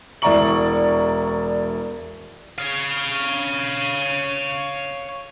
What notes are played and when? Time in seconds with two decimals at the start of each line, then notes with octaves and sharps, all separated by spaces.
0.22 E1 E4 D5 A#5 C#6 F#7
2.58 C#5 F5